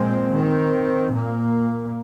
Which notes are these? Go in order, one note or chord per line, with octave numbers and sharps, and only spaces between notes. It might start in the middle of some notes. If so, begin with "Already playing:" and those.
Already playing: A#2 F3 G#3 C4
D#3 C4
A#2 A#3